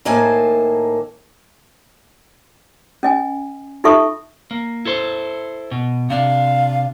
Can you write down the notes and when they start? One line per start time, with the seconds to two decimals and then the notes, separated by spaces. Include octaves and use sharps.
0.05 A2 D#3 A#3 C5 G#5 A5
3.03 C#4 D#5 G#5
3.84 D#4 F4 A4 E5 C#6 D#6
4.51 A#3
4.85 E4 A4 C5
5.71 B2
6.10 C3 D4 F5